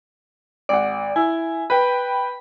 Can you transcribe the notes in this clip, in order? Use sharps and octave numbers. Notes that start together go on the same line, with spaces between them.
G#1 D5 F#5
E4 G#5
B4 G5 B5